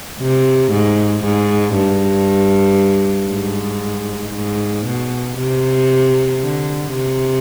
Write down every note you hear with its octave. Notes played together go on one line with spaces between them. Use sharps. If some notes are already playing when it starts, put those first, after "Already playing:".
C3
G#2
G#2
G2
G#2
G#2
B2
C3
D3
C3